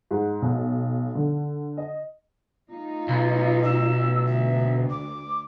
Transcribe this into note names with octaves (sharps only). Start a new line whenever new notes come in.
G#2
B1
D3
D#5
A3 D#4 F4
B1
E6
D2 E5
D6